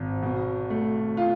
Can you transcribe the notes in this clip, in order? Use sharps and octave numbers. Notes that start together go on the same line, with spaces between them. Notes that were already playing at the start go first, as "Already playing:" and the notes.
Already playing: G#1
B2
A3
F4